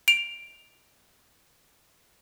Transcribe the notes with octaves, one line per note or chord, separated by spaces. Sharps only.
D7 F7